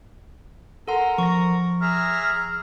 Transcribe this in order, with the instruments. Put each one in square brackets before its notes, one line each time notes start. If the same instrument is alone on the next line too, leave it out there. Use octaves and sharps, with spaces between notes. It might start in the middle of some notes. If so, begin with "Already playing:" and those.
[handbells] A4 F#5 C6 [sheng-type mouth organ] A#4
[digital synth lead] F3 [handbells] C#6 A#6
[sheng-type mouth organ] G#4 E5 A#5 [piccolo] F6